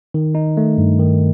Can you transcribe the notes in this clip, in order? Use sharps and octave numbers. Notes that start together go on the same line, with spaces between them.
D#3
D#4
A3
G2
D#3